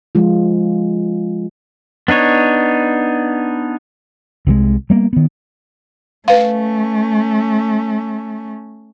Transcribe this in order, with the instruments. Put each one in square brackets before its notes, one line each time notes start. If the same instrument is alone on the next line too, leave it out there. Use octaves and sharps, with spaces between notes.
[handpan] F3 G#3 F4
[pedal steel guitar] B3 D4 D#4 C#5
[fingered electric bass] C2 C3 G3 G#3
G3 A#3 B3
D#3 B3
[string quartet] A3 C#4 [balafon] B4 F5